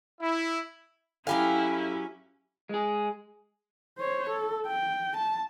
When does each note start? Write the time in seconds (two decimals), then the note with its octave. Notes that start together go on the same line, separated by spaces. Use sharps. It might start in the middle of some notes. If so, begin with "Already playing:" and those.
0.20 E4
1.27 F#3 C#4 E4 G4 A4 F5 G#5 B5
2.69 G#3 G#4
3.99 C5 C#5
4.30 A4
4.67 G5
5.17 A5